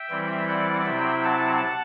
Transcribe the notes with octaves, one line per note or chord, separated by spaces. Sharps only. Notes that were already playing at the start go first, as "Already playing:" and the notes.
Already playing: E5 G5
E3 G3 C4 E4
D5 F#5
C3 F#3 C4 E4 E5 G5
F#5 A5